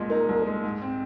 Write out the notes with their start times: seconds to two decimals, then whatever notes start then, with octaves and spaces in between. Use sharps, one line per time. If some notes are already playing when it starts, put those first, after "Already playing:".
Already playing: C2 A#2 G#3
0.10 D#4 A#4
0.28 C2
0.46 G#3
0.64 G#2
0.82 C4